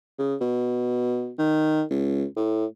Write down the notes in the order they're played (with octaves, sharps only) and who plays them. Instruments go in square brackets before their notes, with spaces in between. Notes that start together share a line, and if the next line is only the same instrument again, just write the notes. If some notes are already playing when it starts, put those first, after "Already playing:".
[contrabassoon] C#3
B2
D#3
C#2
A2